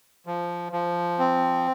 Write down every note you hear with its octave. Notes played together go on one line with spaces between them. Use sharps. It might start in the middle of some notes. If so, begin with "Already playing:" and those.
F3
F3
C4